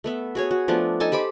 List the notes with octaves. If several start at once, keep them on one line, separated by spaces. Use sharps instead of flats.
A3 B3 E5
F#4 G#4 C#5
F#4
F3 A3 B3 D4
D#4 A4 G#5 A5
G4 C5 B5 D6